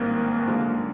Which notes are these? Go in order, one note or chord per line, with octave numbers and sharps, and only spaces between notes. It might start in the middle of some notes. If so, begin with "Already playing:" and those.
Already playing: A1 G#2 D#3 G3 A#3 C4
F#2 D3 F3 G#3